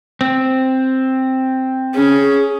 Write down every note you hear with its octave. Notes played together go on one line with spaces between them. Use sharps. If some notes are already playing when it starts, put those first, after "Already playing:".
C4
C#4 G#4